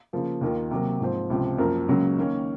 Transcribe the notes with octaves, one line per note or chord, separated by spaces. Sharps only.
C#3 F3 A#3
D#2 D#3 A#3 F4
C3 F#3 A#3
G#2 F3 C4
C#2 C3 F3
F#2 F3 A#3 F4 A#4
C#2 C#3 F#3 A#3 C#4
D#3 A#3 C#4